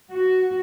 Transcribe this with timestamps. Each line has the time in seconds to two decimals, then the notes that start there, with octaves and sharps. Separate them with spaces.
0.11 F#4